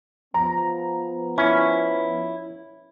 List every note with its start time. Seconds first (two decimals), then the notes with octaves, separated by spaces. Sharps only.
0.34 F3 B3 A#5
1.38 C#4 E4